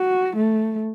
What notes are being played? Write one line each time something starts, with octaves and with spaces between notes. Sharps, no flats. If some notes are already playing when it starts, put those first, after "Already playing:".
Already playing: F#4
A3